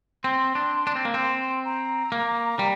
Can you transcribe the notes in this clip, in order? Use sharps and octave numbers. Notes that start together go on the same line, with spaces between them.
C4 C6
D4
D4
C4
A#3
C4 C6
A#5
A#3
G3